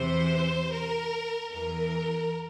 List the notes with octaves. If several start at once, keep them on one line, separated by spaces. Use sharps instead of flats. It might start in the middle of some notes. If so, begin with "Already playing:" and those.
Already playing: E2 C3 E3 C5
A#4
E2 E3 A#4